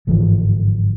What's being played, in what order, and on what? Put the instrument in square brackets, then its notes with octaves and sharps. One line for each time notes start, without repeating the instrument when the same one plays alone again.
[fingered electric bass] G1 G#2 E3 F3